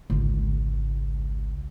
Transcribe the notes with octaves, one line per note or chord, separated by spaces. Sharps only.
G#1 C#2